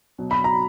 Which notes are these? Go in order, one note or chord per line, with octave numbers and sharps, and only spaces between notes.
B2 F#3
B5
A#5